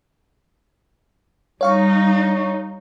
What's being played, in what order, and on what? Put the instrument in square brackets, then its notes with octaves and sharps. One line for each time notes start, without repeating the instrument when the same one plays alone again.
[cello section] G3 D#4 [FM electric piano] C#5 F5 C#6